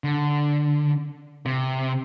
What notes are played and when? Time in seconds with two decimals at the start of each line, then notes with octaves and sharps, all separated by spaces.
0.04 D3
1.45 C3